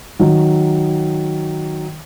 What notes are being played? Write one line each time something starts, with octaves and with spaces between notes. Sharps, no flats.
D#3 F#3